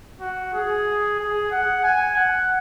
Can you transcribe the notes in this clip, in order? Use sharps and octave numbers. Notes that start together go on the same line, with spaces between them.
F#4
G#4
G#4
F#5
G#5
F#5